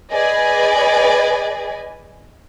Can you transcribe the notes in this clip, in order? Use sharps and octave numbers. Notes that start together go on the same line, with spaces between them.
G#4 B4 D5 D#5 G#5